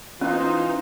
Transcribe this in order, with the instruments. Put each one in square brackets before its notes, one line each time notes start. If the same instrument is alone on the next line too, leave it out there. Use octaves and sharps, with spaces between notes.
[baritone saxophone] E3 [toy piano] C#4 [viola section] D#4 C5 [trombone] F4